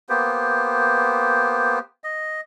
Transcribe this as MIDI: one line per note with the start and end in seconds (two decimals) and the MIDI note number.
0.09 1.79 58
0.09 1.79 59
0.09 1.79 67
0.09 1.79 72
2.04 2.41 75